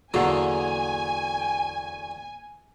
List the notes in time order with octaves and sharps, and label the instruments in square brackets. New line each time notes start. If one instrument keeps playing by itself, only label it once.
[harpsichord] E2 D3 F#3 [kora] A#3 G#4 A4 [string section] G#5